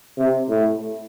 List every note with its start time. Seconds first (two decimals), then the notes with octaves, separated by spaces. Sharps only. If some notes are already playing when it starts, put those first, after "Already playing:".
0.18 C3
0.49 A2